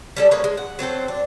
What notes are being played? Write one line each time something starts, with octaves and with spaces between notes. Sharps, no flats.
G3 C#4 A4
G#3 A#3 B4 C#5
G#3
F#5
F#3 C4 A4 C5
D4